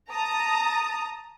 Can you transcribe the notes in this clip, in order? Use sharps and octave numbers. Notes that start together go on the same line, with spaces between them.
A5 A#5 D#6